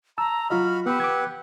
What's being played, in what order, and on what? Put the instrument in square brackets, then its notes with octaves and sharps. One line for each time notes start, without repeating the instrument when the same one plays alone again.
[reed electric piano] A5 E6 [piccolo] A#5
[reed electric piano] F#3 F4 D#5 [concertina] F#4 B5 [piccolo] F6
[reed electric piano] B3 B5 [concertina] G4 B4 F#5 [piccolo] E6
[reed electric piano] D6 G#6